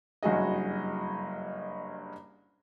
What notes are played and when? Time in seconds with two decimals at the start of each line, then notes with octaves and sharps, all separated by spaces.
0.23 F#1 G2 F#4 G#4 D#5